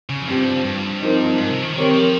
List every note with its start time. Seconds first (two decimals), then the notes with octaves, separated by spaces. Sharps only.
0.10 C#3
0.22 F2
0.27 G2 F3 C4 G4
0.64 G2
1.01 F3 C4 D#4 A#4
1.38 G#2
1.50 C3
1.62 D#3
1.74 D#3 C4 G4 A#4 C#5
1.93 F3